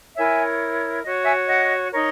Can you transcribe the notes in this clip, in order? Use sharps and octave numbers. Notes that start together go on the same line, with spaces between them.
E4 A#4 C#5 E5 G#5
F#4 C#5 D#5
E5 G#5
D#5 F#5
D#4 A#4 C#5